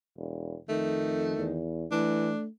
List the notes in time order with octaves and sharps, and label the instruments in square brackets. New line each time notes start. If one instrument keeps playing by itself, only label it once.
[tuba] E1
[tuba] F2 [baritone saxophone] D#3 [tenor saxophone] A3
[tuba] E2
[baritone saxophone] E3 [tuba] A3 [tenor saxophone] D4